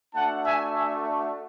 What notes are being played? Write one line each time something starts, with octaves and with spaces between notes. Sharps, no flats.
A3 D4 F#4 F#5 A5
E5 G#5
E5 G#5